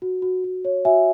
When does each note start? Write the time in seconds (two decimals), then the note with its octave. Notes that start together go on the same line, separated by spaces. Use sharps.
0.02 F#4
0.22 F#4
0.44 F#4
0.65 C#5
0.85 F#4 E5 G#5